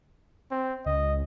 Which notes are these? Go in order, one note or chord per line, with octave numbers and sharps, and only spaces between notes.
C4
C#2 D#5